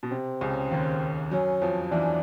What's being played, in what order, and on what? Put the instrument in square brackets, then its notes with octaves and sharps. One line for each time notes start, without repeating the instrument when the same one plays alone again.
[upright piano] B2
[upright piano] C3 [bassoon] C4
[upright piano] C#2 C#3
D#2 D#3
[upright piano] F#2 F#3 [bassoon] C#4
[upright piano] F2 F3
[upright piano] E2 E3 [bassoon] D4